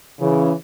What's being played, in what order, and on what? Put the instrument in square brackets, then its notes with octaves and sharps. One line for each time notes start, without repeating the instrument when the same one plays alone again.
[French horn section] C#3 E3